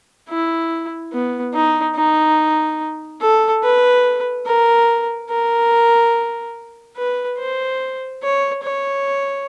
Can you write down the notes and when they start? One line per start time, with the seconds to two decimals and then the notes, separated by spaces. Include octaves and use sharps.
0.29 E4
1.13 B3
1.54 D#4
1.96 D#4
3.21 A4
3.64 B4
4.47 A#4
5.30 A#4
6.98 B4
7.39 C5
8.23 C#5
8.64 C#5